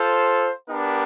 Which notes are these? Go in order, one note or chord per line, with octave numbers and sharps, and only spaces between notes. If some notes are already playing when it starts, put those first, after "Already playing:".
Already playing: F4 A4 C5
B3 D4 G4 A#4